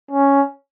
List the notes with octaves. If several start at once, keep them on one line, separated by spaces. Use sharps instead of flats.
C#4